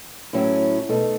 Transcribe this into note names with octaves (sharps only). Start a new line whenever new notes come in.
A2 F#3 C#4 E4
B2 A3 D#4 A4 D#5